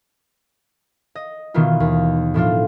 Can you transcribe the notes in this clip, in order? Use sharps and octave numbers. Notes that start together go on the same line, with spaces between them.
D#5
B2 D#3 E3 B3 F4
D#2
A2 F3 D4 F4